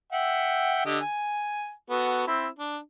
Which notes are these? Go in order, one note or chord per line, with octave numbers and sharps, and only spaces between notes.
E5 F#5 G5
D3 G4 D#5
G#5
B3 F#4 A4
C4 E4
D4